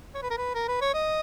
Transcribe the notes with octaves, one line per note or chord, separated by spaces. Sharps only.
C#5
B4
A#4
B4
A#4
B4
C#5
D#5